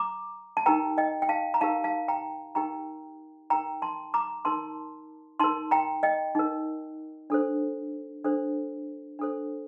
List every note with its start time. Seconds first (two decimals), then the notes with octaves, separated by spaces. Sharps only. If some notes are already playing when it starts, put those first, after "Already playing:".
Already playing: A#5 D6
0.57 A5
0.66 D#4 G4 A#4 G5 A#5
0.98 D#5 G5
1.22 G5
1.29 F5 A5
1.54 A#5
1.61 D#4 G4 A#4 F5 A5
1.84 F5 A5
2.08 G5 A#5
2.55 D#4 G4 A#4 G5 A#5
3.50 D#4 A#4 G5 A#5
3.82 A5 C6
4.14 A#5 D6
4.45 D#4 A#4 A5 C6
5.40 D#4 A#4 A5 C6
5.71 G5 A#5
6.03 D#5 G5
6.35 D#4 A#4
7.30 D4 A4 C5
8.24 D4 A4 C5
9.19 D4 A4 C5